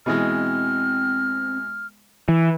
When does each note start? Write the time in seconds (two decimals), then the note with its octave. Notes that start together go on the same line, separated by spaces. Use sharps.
0.06 B2 E3 G#3 C4 F6
2.29 E3